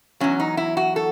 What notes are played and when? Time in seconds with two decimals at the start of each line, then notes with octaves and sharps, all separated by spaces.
0.20 B2 F#3 C#4
0.24 E2
0.40 D#4
0.57 E4
0.77 F#4
0.96 A4